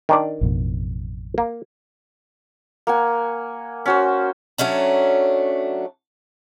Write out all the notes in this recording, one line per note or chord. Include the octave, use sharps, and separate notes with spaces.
D#3 D4 D5
A1 F2 B2
A#3
A#3 F#5 G#5
C#4 F#4 C5
F#3 A3 C#4 D4